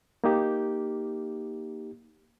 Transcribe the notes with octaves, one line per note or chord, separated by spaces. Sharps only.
A#3 D#4 G4